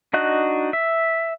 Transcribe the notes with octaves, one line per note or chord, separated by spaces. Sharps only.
D4 D#4 F#4 D#5 F#6
E5